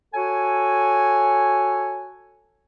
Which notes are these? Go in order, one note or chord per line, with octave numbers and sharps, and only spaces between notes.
F#4 A4 C#5 G#5